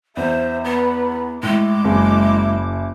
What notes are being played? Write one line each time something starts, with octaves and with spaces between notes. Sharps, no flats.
E2 C5 E5
B3 B4
A2 G#3 E4 D6
F#1 G#4